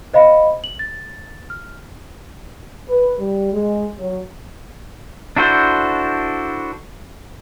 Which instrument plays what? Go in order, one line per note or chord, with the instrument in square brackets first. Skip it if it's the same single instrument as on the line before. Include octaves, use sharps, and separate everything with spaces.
[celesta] C5 D#5 F5 B5
F#7
A6
F6
[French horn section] B4
G3
G#3
F#3
[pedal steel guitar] D4 E4 F#4 A4 C5